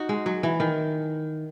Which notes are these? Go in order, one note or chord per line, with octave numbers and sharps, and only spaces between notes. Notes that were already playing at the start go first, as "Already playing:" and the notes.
Already playing: D#4 F#4
G#3
F#3
E3
D#3